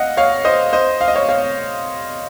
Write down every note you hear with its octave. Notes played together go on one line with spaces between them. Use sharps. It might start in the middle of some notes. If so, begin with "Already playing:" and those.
Already playing: D#5 F5 F#5
C#5 F5
C5 D#5
C5 D#5
F5
D#5
C#5 F5
C#5 F5